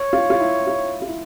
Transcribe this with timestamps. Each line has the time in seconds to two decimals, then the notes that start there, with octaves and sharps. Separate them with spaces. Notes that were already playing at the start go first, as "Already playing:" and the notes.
Already playing: C#5
0.13 F4
0.30 F4
0.40 E4
0.67 F4
1.02 F4
1.08 E4